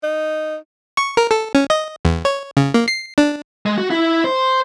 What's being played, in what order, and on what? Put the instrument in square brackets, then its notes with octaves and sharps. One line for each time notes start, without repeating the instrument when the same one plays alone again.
[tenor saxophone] D#4
[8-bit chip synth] C#6
A#4
A4
C#4
D#5
E2
C#5
C#3
A#3
C7
D4
[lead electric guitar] G#3
F#4
E4
C5